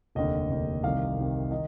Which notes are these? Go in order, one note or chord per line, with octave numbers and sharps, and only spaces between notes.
F1 D#2 D3 D#5
F1 D#2 D3
C2 C3 D#3 F5
C2 C3 D#3
D#3 D#5